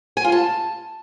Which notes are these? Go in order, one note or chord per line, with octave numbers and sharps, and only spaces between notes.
G#5
F4
A5